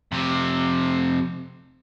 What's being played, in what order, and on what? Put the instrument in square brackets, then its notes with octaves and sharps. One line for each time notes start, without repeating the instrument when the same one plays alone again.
[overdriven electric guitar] F2 C3